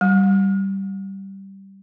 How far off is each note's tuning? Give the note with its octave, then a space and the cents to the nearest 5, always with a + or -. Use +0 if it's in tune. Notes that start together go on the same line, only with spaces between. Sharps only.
G3 -10